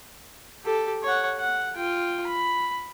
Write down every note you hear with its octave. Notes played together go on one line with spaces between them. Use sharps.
G4 A4
C#5 F#5
F#5
F4 G5
B5